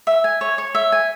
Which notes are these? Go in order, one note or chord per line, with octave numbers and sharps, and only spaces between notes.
E5
G#5
C#5
C#5
E5
G#5